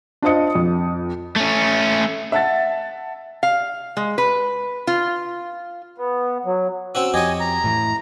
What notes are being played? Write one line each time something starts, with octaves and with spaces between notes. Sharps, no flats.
D4 F4 C5 D#5 D#6 C#7
F2
A3 C#4
E5 F#5 A5 A6
F5
G#3
B4
F4
B3
F#3
C4 C#4 F#4 E6
F2 G4 C#5 D#5 G#5
A#5
A2 E3